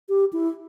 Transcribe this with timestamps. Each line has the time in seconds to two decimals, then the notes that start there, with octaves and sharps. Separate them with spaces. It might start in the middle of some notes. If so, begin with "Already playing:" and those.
0.09 G4
0.33 E4